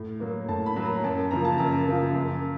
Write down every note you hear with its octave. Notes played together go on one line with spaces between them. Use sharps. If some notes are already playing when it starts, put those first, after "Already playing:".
Already playing: A2
F#3 A#3
A2 A5
B5
F#3 A#3
A#5
F#2 A5
C#3 F3 A#3 A#5
A5
F#2 A#5
C#3 F3 A#3
F#2